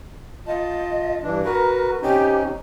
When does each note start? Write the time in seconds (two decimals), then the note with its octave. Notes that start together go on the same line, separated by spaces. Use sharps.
0.47 F4 D#5 A5
1.23 G2 E3 D4
1.45 F#4 A#4 B4
2.02 C3 C#4 D#4 G4